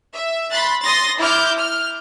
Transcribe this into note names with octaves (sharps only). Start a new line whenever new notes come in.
E5
B5 C6 F#6 A6
C6 D#6 A6 A#6
E4 D6 F6 G6
F6